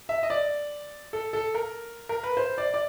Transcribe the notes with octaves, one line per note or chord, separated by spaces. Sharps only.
E5
D#5
D5
A4
A4
A#4
A#4
B4
C5
D5
D5